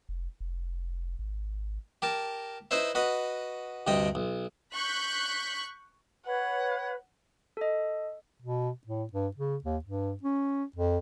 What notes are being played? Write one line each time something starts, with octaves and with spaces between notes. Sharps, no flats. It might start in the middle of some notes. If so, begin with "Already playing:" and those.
F1
F1
G#1
G4 A#4 A5
D#4 E4 B4 C5 E5
F#4 B4 D#5
D2 G2 C3 D#5 G5
B1
C#6 F#6 G6 B6
B4 C#5 F#5
A4 D#5
B2
A2
G2
C#3
D#2
G2
C#4
F2